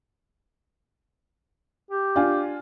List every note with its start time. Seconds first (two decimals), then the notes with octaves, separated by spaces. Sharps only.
1.91 G4
2.16 D4 F4 G#5